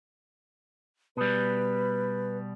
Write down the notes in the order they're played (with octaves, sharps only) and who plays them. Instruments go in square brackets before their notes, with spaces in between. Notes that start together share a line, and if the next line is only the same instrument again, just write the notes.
[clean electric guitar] B2 G3 [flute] B4